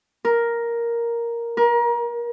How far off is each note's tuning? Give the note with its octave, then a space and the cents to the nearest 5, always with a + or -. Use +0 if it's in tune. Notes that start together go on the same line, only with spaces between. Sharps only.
A#4 +5
A#4 +30